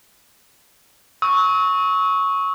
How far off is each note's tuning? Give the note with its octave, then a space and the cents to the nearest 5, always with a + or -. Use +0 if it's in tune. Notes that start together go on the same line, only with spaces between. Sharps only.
C#6 +0 E6 -40